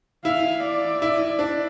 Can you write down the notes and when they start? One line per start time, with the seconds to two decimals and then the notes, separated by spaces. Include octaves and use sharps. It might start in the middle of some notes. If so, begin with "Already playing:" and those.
0.25 E4 F5
0.63 D5
1.02 E4
1.39 D4